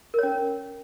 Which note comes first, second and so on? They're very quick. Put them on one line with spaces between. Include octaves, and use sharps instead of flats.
A#4 C#5 C#4